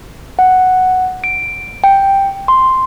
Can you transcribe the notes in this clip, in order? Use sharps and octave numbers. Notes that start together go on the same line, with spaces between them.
F#5
D7
G5
C6